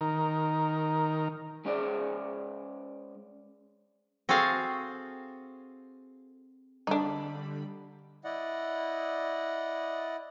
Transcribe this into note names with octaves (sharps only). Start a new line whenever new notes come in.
D#3 A#4
G#3 C#4 G#4 C5 D5
C4 F#4 G#4 A4 F5
D3 G3 D4 D#4 B5
E4 D5 D#5 F#5